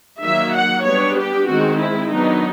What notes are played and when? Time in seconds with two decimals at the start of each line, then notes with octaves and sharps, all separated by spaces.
0.22 D#3 F#3 A#3 E5
0.54 F#5
0.85 G3 B3 D4 C#5
1.16 G4
1.47 D#3 G#3 C4 F#4
1.79 E4
2.09 D#3 F#3 B3 D4 D#4